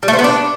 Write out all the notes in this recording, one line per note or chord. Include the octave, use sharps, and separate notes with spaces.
G3
A3
C4
B3
D4